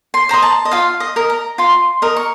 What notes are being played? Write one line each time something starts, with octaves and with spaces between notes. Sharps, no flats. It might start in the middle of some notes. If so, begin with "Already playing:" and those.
C6
C5 D#5 A#5
A5
D#5
F4 F5
D#5
A#4 D#5
A#5
F4 C6
A#4 D#5
C#6